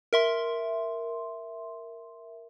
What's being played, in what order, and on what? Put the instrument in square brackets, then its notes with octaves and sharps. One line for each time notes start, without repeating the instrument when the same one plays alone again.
[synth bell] A#4 E5 C6